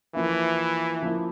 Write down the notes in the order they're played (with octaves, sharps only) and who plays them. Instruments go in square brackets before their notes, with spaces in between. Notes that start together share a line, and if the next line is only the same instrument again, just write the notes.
[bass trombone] E3 [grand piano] F3 A#3 E4
[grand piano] F3 A#3 E4